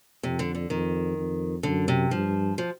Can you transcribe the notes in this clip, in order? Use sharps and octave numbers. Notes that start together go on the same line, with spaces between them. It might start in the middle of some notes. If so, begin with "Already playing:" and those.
F2 C3
D3
D3
F2 D#3
F2
F#2 D3
C3
G2 F3
F3